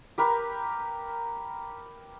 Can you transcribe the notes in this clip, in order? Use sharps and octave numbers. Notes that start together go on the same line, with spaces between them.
G4 A#4 B4